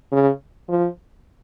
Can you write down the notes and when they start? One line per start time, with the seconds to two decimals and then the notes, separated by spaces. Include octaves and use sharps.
0.12 C#3
0.69 F3